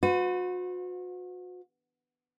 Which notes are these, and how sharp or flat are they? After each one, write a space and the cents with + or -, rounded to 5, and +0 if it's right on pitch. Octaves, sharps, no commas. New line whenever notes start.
F#4 -35 B4 +40